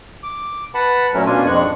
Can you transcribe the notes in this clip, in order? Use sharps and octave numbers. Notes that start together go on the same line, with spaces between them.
D6
B4 F#5 A5 B5
A#2 F#3 A3 C#4 A#4
B2 A#3 C#4 D4 F4 G#5
F2 G#2 G#3 D4 C#6 F#6